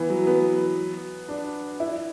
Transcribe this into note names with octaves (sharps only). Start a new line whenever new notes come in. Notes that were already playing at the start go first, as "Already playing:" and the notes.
Already playing: E3 B3
F#3
B3
D4
E4